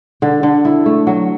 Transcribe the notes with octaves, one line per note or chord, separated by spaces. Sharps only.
D3
D3
E4
A3
F#3